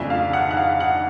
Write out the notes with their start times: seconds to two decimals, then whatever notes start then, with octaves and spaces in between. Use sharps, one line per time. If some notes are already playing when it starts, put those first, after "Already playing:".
Already playing: F2 C#3 F3 A3 D4 E5
0.10 F5
0.33 F#5
0.51 F#5
0.57 F5
0.80 F#5